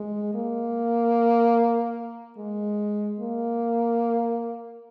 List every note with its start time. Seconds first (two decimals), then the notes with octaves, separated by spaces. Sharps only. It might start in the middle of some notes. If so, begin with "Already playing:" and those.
Already playing: G#3
0.35 A#3
2.37 G#3
3.19 A#3